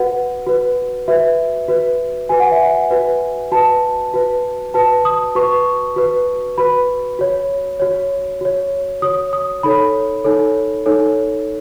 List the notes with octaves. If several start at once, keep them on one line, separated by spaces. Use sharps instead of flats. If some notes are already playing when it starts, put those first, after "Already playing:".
Already playing: F#4 B4 F#5
F#4 B4
F#4 B4 E5
F#4 B4
F#4 B4 G#5
F#5
E5
F#5
F#4 B4
F#4 B4 A5
F#4 B4
F#4 B4 A5
D#6
F#4 B4 C#6
F#4 B4
F#4 B4 B5
F#4 C#5
F#4 C#5
F#4 C#5
F#4 C#5 D#6
D#6
D#4 A4 C#5 B5
D#4 A4 C#5
D#4 A4 C#5